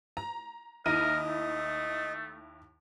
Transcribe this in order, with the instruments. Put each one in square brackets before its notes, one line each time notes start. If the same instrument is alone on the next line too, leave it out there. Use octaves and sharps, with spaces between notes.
[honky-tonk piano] A#5
[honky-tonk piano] D#2 E4 D#7 [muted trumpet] A#4 [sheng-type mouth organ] D#5
[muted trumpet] A3